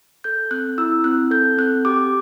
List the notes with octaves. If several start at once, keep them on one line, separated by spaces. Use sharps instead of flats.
A4 G6
C4 F#6
E4 E6
C4 F#6
A4 G6
C4 F#6
G4 D6